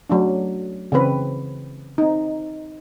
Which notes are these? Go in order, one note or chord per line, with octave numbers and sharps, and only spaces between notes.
F#3 A3 D4
C#3 E3 C4 B4
C4 D#4